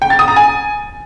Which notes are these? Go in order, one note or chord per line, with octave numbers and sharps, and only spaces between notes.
G5
A6
D#6
A#5
G#5